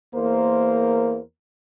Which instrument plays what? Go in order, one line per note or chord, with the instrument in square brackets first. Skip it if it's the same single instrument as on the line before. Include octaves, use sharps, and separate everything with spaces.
[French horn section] E2 A#3 A#4 C5